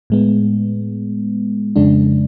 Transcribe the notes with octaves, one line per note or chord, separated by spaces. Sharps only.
A2 G#3 B3
F2 C#3 G#3 D4